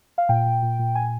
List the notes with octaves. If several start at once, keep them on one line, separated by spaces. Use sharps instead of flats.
F5
A#2 G5
A#2
A#2
A#2
G#5